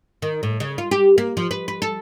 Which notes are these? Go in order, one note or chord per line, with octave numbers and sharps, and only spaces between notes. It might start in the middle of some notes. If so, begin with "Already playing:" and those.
D#3
A2
C#3
F4
G4
A#3
F3
B4
B4
A4